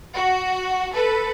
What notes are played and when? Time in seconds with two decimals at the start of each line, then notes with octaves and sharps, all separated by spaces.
0.15 F#4
0.94 A4 B4